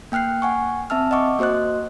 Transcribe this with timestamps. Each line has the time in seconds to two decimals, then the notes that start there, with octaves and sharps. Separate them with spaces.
0.12 A#3 G5 F6 F#6 C7
0.42 F#5 G#5 C#6
0.90 C4 E5 A5 E6 F6
1.11 D#5 F#5 C#6 D6
1.39 A#3 F#4 C5 D#5 F#6